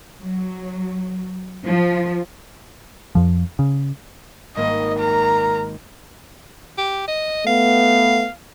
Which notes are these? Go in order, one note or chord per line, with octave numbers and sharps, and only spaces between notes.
F#3
F3
F2 F3
C#3
G#1 A#3 D#5
A#4 A#5
G4
D#5
A3 B3 F5